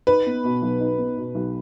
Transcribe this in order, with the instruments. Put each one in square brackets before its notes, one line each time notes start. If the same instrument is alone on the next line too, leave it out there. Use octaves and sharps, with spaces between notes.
[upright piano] D#4 [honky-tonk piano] B4
[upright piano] B3
B2
B1
D#4
B3
B2
B1